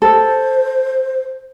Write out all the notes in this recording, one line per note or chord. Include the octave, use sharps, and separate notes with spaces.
A4 C5